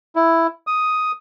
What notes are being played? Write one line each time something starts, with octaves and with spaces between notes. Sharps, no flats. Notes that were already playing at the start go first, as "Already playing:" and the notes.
E4
D#6